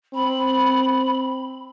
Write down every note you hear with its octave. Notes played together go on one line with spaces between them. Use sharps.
C4 B5